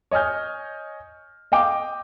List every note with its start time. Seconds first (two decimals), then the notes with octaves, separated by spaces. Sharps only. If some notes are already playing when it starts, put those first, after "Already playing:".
0.11 C#5 D#5 G#5 F6 G6
1.52 D#5 F5 G5 D6